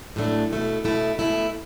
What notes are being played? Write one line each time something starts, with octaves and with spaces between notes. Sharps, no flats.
A2 F#3 A3 D4
B2 A3 E4
B2 A3 E4
B2 A3 E4